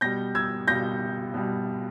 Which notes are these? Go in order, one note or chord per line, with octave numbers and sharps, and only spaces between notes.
B2 G3 G6 A#6
E6 G#6
B2 G3 G6 A#6
B2 G3